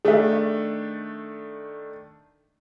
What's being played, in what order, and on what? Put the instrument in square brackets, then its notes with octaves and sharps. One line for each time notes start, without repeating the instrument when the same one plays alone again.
[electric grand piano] D#3 A3 D4 [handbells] G#4 E5